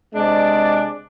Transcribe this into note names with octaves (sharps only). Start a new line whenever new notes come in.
C3 G#3 D4 D5